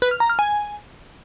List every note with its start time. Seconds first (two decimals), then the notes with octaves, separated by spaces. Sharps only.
0.02 B4
0.11 F6
0.20 A#5
0.30 F6
0.39 G#5